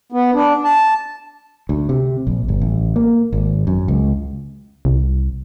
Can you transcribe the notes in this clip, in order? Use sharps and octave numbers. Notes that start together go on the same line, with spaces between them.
B3
D4
A5
D2
C3
A#1
G1
A1
A#3
G#1
F#2
C#2
C2